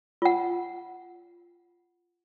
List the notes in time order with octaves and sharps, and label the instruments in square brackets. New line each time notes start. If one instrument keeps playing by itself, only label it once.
[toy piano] F4 F#5